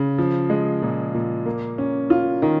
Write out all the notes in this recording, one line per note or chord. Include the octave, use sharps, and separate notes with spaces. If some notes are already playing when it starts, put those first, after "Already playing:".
Already playing: C#3
F3
G#3
A#2
A#2
A#3
C#4
F4
D#3